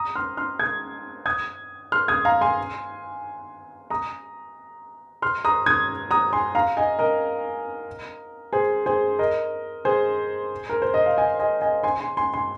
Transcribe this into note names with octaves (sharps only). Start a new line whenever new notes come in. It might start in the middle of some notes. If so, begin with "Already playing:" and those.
Already playing: A#5 D#6
C6 F6
C6 F6
D#6 G#6
D#6 G#6
C6 F6
D#6 G#6
F5 A#5
G#5 C6
A#5 D#6
C6 F6
A#5 D#6
D#6 G#6
A#5 D#6
G#5 C6
F5 A#5
D#5 G#5
A#4 D#5
G#4 C5
G#4 C5
A#4 D#5
G#4 C5
A#4
C5
D#5
F5
D#5 G#5
D#5 G#5
D#5 G#5
G#5 C6
G#5 C6
G#5 C6
G#5 C6